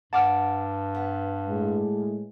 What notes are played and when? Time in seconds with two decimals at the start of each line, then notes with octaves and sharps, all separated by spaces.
0.13 G2 F#5 A5 D6 F6
0.95 B3
1.47 A2 G#3